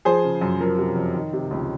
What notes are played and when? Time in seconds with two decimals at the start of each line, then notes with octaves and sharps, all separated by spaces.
0.05 F3 G#4 C5
0.24 C#3
0.41 F#2
0.60 F3 A#4
0.78 C3
0.96 F2
1.14 D#3
1.33 C3
1.51 C#2